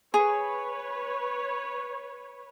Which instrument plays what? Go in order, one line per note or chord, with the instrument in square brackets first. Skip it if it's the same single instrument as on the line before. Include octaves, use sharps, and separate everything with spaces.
[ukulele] G#4 [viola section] B4 C#5